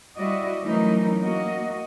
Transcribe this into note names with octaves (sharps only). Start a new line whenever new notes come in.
G3 E4 F#4 D5 D#5
E3 F#3 A3 C#4 D#4 A#4
A#3 F#4 D#5